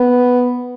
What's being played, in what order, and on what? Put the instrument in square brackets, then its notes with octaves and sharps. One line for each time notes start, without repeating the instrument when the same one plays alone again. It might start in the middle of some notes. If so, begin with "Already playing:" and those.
Already playing: [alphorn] B3